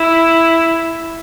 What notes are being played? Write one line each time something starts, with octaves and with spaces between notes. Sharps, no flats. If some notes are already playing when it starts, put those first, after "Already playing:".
Already playing: E4